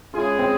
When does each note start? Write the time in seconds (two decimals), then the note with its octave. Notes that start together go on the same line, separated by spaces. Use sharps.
0.14 G#3 C#4 E4 F4 G#4
0.39 C4